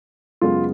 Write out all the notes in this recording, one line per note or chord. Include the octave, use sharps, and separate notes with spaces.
F#2 C#3 G#3 B3 F4